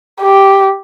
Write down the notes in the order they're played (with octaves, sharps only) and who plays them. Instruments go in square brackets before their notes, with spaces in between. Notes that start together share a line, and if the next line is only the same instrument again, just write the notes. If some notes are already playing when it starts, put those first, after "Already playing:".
[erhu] G4